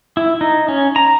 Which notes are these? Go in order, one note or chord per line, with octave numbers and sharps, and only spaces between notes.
E4
D#4
C#4
A#5